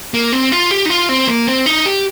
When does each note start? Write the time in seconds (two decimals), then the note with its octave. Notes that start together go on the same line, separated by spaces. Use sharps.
0.14 A#3
0.32 C4
0.52 F4
0.71 G4
0.86 D#4
0.90 F4
1.09 C4
1.28 A#3
1.47 C4
1.66 D#4
1.86 G4